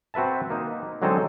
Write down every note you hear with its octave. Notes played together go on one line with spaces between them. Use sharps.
C4 F#4 B4 E5 A5
A#3 D#4
D3 F#3 G#3 C4 D#4 A4